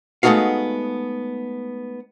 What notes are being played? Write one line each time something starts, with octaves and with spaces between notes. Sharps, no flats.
G#3 A3 B3 D#4 F#4 F5